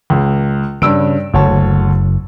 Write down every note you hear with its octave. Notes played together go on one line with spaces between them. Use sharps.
C#2
G2 C#3 E6 D7
F#1 D2 C#5 A5